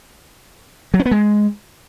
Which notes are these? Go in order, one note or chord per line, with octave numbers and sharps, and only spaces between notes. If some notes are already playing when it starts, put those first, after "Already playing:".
F#3
C#4
B3
G#3